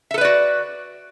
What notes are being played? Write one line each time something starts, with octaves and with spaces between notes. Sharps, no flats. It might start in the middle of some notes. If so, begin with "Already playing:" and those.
F#4 A4 B4 D5 E5